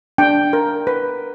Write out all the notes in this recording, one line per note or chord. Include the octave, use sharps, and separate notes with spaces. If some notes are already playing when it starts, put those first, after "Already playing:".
D4 G5
A#4
B4